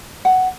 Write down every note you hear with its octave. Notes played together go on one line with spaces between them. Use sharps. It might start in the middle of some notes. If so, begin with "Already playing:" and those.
F#5